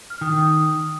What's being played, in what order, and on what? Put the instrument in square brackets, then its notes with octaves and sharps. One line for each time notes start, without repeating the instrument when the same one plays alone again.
[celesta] F6
[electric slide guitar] D#3 [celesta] D#6
[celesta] D#6